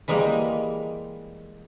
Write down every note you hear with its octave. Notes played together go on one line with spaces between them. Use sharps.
E3 G3 G#3 A#3